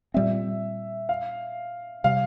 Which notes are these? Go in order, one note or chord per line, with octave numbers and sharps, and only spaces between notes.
A#2 G3 C4 E5
F5
C3 G3 F5